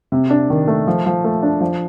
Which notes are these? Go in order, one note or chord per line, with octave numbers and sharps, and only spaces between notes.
C3
D4
D#3
A3
F3
F3
A3
D4
F3